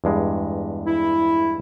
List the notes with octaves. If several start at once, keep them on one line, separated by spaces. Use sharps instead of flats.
E2 G2 G#3
E4